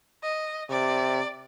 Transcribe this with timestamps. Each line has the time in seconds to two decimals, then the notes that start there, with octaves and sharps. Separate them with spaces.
0.23 D#5
0.70 C3 D5